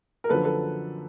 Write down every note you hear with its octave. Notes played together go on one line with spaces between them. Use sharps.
A#4
F#2 D3 F3 A4 B4
A4 B4